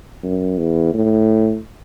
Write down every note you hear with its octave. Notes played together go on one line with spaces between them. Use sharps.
F#2
E2
A2